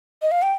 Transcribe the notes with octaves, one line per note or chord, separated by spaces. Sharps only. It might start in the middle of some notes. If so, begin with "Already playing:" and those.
D#5
F5
G5